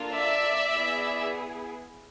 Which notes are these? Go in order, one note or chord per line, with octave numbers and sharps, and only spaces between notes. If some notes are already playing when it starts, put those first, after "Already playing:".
Already playing: A#3 D4 F4 A4
D5 E5
B3 E4 G#4